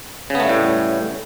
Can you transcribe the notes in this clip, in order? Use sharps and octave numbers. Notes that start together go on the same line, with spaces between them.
A2 C#3 G3 A3 B3